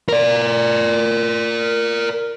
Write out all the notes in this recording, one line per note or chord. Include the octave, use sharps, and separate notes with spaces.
A#4 D5